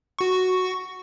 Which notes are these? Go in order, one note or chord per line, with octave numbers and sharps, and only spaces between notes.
F#4 C#6